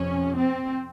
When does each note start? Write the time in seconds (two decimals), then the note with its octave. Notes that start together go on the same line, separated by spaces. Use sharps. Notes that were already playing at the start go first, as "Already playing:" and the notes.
Already playing: F2 C3 C#4
0.36 C4